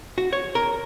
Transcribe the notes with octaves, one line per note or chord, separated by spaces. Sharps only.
F#4
C#5
A#4